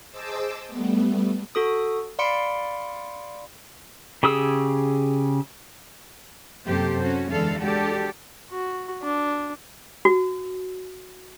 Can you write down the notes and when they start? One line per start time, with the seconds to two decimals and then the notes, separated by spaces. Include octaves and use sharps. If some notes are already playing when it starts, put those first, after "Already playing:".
0.11 G#4 C5 D#5 A5 D6 E6
0.68 G3 A3 B3
1.55 F#4 A4 D#6
2.19 D5 F5 B5 C6 C#7 D7
4.23 C#3 G4 G#4 D#6 E6
6.67 F#2 C3 A#3 G4 A4 C5
7.02 C#4 F#4
7.31 E2 D3 E3 G#3 A4 F5
7.61 G#3 D4 F#4 G4 A4
8.51 F#4
9.03 D4
10.05 F#4